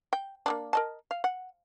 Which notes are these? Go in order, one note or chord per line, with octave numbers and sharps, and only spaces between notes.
G5
A#3 B3 D4
A#4 D#5 A5
F5
F#5